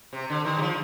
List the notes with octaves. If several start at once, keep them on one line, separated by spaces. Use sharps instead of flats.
C3
D3
D#3
G3
F3